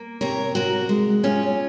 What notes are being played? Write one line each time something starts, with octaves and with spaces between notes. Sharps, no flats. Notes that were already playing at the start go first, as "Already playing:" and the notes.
Already playing: A#3
C3 A#4 C#5
C3 F#4 A#4
G#3
C3 C#4 F4